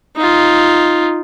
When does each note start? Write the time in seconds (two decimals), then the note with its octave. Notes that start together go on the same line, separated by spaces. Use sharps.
0.16 D#4 F4